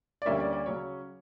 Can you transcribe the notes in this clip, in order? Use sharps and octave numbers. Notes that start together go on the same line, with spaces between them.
D5
D2 D3 G3 A#3 C#4 E5
D5
D5
C#3 F#3 C#4 C#5